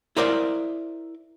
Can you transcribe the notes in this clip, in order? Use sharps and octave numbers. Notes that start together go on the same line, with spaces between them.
E4 A#4 C5 D5 E5 F5